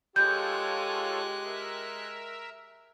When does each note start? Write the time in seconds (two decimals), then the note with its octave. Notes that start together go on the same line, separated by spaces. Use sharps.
0.16 G#3 F4 G4 A4 C#5 F#6 G6
1.44 A#4 E5